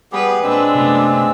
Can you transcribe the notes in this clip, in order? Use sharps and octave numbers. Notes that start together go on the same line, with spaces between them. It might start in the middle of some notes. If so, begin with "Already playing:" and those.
G3 B3 G4 G#4 B4
A#2 G#3 C4 D4 B4 E6
F#2 C3 A3 B3